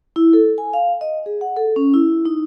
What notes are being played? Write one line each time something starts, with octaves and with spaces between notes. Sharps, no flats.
E4
A4
G#5
F5
D#5
G#4
F#5
A4
C#4
E4
D#4